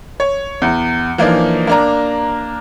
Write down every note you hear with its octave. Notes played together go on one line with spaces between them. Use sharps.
C#5
E2
E3 F3 A#3 D4 D#4
A#3 D4 A#5